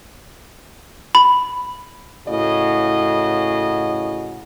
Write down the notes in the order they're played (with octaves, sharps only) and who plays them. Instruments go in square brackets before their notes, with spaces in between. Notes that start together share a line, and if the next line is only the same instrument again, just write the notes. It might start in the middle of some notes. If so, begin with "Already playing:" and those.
[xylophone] B5
[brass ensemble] A2 C#3 F#4 D#5